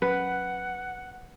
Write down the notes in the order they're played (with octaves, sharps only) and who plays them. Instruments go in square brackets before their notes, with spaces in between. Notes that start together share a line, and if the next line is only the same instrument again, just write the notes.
[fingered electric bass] F#3 C#4 [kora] B4 [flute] F#5